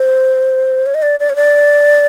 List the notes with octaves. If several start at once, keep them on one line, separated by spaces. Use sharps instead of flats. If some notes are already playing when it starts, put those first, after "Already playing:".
Already playing: C5
C#5
D#5
D5
D5
C#5
D5